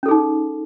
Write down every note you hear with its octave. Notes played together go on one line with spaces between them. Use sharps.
C#4 D#4 G#4 A4